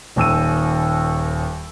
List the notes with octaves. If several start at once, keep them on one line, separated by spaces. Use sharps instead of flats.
D#1 D#2 E6 D#7